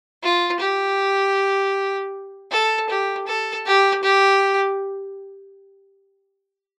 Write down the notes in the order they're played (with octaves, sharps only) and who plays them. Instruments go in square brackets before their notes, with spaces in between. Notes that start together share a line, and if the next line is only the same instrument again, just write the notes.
[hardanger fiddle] F4
G4
A4
G4
A4
G4
G4